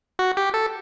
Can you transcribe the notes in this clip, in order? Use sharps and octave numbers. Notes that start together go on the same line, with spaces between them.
F#4
G4
A4